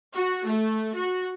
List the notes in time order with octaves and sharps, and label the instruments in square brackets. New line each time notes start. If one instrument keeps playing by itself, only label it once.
[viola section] F#4
A3
F#4